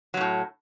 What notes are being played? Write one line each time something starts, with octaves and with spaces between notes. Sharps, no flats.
A2 C3 F#3